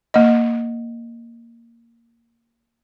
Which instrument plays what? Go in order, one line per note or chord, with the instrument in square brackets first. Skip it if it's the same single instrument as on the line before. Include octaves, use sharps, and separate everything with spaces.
[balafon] A#3 D#5